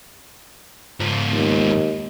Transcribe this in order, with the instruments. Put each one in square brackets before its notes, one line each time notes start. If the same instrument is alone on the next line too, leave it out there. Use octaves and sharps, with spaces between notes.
[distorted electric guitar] G#2 F4
[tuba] D#2